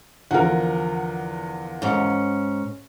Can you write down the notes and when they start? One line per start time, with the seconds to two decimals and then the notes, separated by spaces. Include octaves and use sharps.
0.31 E2 D3 F3 A#4 F#5
1.82 G#2 C#4